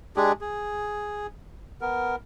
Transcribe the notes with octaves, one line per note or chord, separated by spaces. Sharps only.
G#3 D4 G4 G#4
G#4
B3 A#4